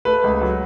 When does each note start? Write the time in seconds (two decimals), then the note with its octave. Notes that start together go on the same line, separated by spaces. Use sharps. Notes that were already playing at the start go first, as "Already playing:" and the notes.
0.05 A3 B4
0.24 C#2
0.42 F#3